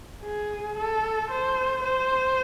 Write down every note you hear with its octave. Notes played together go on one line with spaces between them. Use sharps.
G#4
A4
C5
C5